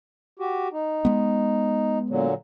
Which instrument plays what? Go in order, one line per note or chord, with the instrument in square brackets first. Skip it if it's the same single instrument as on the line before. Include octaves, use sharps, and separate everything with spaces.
[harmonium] F#4 G4
D#4
[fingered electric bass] G#3 B3
[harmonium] A#2 D3 F#3